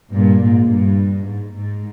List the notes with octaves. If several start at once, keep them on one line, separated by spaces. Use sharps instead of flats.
G2 A#2
G#2
G2
G#2
G#2